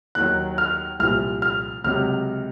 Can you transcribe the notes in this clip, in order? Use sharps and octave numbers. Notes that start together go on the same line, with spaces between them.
D#2 D#3 F#3 F#6
F6
C2 A#2 F3 F6
F6
C#2 C3 F#3 F6